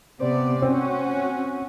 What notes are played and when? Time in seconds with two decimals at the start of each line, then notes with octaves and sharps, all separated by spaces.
0.21 C3 B3 C5 D5
0.62 C4 C#4 F#4